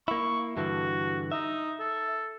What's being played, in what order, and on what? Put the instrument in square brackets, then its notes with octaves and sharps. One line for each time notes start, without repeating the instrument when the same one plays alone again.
[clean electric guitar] A#3 E4 [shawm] C#6
[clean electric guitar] G2 D3 E3 [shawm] F#4
[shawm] D#4 [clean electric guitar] E5
[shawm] A4